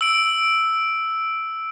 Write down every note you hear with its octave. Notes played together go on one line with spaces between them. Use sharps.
E6 D7